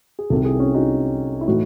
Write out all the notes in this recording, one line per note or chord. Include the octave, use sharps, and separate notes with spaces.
G#4
C2 C3 D#3 F#4 A4
E4 G#4
C#4 E4
D#4 F#4
E4
A2 E3 A3 D#4 F#4